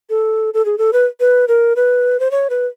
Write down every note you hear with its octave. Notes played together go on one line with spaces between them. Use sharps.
A4
A4
G#4
A4
B4
B4
A#4
B4
C5
C#5
B4